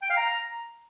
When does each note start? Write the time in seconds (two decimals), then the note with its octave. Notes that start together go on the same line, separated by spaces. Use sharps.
0.03 G5
0.10 F5
0.17 A#5